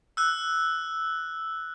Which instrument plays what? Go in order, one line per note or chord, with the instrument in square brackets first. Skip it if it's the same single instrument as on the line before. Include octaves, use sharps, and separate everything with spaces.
[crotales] E6 F#6